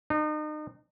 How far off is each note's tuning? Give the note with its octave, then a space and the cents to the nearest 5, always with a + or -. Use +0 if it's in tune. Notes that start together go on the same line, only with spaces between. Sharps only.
D#4 -35